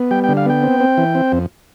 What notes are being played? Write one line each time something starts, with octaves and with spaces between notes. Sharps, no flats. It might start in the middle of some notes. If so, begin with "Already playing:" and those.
Already playing: B3
G3 G5
G5
D3
F5
B3 G5
C4
C4
E3
C4
F2